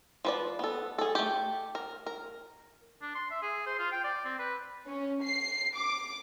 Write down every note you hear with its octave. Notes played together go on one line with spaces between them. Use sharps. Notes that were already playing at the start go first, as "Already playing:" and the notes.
F3 B4 D5
B3 A4
G#4 A4
A3 G4
A#4
A#4
D4
C6
E5
G#4
C5
F4
G5
D5
C4
B4
C#4
C7
D6